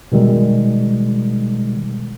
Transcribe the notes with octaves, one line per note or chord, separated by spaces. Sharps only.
B2 D#3 G3 G#3